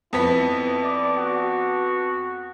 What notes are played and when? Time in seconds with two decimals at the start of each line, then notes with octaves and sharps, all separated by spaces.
0.13 F2 B3 E4 B6
0.84 D5
1.18 F#4